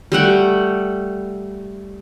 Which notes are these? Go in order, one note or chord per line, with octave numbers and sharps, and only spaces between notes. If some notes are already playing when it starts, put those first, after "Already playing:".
G3 A3 F#5 G5